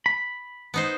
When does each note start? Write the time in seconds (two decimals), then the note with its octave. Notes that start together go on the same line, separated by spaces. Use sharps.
0.06 B5
0.74 B3 D#4 C5